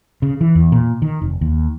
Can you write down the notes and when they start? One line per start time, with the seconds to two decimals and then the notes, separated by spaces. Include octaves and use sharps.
0.22 C#3
0.41 E3
0.55 E2
0.72 A#2
1.02 D#3
1.22 F1
1.41 D#2